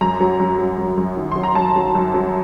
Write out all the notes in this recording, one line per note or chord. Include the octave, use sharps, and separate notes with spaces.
F#2 A#5
F#3
F#2
F#3
F#2
F#2
D#3
F#3 C6
A#5
F#2 A5
F#3
F#2
F#3